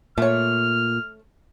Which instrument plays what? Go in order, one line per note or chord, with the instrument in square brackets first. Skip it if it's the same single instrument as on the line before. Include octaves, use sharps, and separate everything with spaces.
[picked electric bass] A#2 [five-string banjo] A3 C#5 [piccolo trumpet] F6